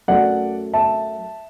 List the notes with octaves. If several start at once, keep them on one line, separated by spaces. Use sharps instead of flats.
F#2 F#3 A3 D5 F#5
E5 A5